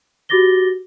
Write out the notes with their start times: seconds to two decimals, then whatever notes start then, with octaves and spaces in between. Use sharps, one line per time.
0.29 F#4 G4 D6 A6 A#6 G7